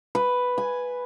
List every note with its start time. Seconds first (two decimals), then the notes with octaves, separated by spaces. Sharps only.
0.15 B4
0.58 G#5